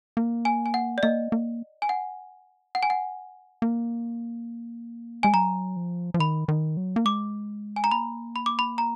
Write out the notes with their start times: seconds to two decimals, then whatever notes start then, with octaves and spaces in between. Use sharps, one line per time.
0.17 A#3
0.45 G#5
0.66 G#5
0.74 F#5
0.98 D5
1.03 A#3 D#5
1.32 A#3
1.82 G#5
1.89 F#5
2.75 F#5
2.83 G#5
2.90 F#5
3.62 A#3
5.23 G#3 G#5
5.34 F#3 A#5
5.76 F3
6.14 F3
6.19 D#3 B5
6.48 D#3
6.77 F#3
6.96 A#3
7.05 G#3 D6
7.76 G#5
7.84 A#5
7.91 A#3 B5
8.36 B5
8.46 D6
8.59 B5
8.78 A#5